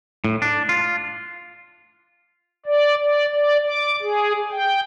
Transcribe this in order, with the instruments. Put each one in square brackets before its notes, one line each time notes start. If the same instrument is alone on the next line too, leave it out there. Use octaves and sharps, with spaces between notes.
[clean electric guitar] A2
D4
F4
[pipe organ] D5
D5
D5
D6
G#4
G5